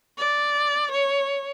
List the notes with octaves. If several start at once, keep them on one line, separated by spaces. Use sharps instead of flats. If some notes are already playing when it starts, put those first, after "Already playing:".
D5
C#5